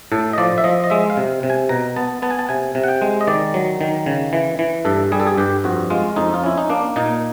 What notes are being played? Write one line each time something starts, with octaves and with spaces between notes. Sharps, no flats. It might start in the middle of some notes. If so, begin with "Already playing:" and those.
A2 A4
D#5
F3 D5
E5
F3 D#5
D#5
G#3 E5
F5
C3
C3
G#5
B2 A#5
B3 A5
B3 A5
G#5
A5
C3 G#5
C3
F#5
G5
G#3
D#5
D#3 D5
F#3
D#3
C#3
E3
E3
G2 A4
G3 G#4
A4
G#4
G2 G4
F2 F#4
G#3 F4
F2 D#4
F4
C#4 E4
D#4
A#3 D4
A#2 D#4